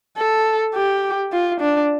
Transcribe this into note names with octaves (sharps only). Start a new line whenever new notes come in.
A4
G4
F4
D4